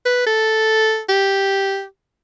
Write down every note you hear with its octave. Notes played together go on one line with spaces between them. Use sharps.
B4
A4
G4